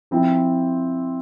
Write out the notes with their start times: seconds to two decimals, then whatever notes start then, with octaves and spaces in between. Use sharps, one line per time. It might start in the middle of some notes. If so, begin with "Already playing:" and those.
0.11 F3 C4 E4